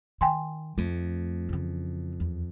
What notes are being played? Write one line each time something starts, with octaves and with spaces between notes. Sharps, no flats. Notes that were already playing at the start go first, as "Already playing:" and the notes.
D#3 G5 G#5 C6
F2 A3
C#3 E3
E2